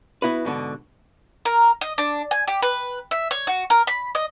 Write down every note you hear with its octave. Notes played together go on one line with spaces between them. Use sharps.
B3 E4 F#4 B4
G#2 B2 D3
A#4
D#5
D4
G#5
G4
B4
E5
C#5
F#4
A#4
B5
D#5